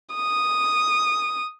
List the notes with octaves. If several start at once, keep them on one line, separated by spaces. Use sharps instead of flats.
D#6